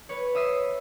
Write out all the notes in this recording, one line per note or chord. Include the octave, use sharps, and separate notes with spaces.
B4 C#5
E5 D#6 E6 B6 C7